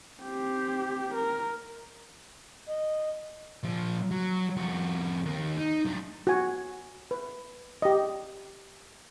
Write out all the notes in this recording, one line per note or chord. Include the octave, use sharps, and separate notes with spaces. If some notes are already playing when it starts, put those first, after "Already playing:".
C4 G4
A#4
D#5
A#2 F3
F#3
F2 F#4
D#2 A#3
D#4
F#3 D4
F#4 G#5
B4
G4 D#5